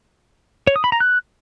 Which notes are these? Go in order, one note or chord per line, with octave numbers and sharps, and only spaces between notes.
C#5
D#6
B5
A#5
F#6